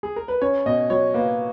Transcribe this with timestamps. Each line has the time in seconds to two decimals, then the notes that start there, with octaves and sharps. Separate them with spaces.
0.03 G#4
0.16 A#4
0.28 B4
0.41 C#4 C#5
0.66 B2 D#5
0.90 F#3 C#5
1.14 A#3 B4